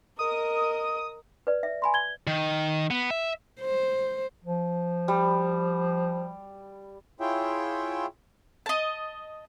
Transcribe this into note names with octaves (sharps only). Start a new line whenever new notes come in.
A#4 D#5 D#6
B4 D5
E5
G#5 B5 C6
G#6 G7
D#3
B3
E5
C5
F3
G3
E4 F4 G#4 C#5 E5 G5
D#5 A5